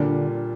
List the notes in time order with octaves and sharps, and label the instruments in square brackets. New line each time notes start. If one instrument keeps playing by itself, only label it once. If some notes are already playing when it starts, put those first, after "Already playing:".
Already playing: [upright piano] A#2 G3 A#3 D4 [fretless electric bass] D3